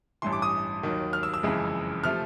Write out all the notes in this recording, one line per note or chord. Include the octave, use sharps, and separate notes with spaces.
A1 G2 E3 C6
D6
D#6
D#2 D#3 F#3
F6
E6
E6
F#1 F2 C#3 E3 G#3
C3 F3 A3 F6